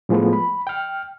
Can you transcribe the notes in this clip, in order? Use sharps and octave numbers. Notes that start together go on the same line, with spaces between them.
A2 F3 G#3 A3 B3
B5
G5 F6